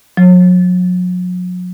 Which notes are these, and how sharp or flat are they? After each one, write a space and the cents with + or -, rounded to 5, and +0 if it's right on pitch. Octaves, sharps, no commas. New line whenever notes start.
F#3 -40